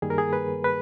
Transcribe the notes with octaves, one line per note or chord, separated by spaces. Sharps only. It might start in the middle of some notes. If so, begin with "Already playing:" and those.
G2 D#3 G3 A#3 G#4
A#4
G#4
B4
B4